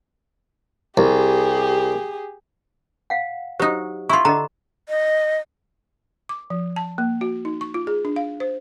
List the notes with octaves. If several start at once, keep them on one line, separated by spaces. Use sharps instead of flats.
C2 G4 G#4
F5 F#5
F#3 D#4 G4 C5
E4 F4 C6 C#6
D3 D#5 A#5
D#5
D6
F3
A5
A#3
F#4
D#4
C#6
F4
G#4
D4
F5
C5